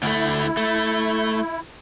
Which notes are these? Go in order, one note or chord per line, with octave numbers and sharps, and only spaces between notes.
D2 A3 E4
A3